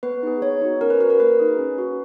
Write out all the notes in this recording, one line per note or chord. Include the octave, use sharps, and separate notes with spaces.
B3 B4
D#4 G#4
B3 C#5
D#4 F#4
C#4 A#4
B4
F#4 B4
A#4
A#3 B4
D#4 G#4
C#4
F#4